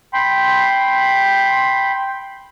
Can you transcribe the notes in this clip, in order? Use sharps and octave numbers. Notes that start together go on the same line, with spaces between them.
G5 B5 C6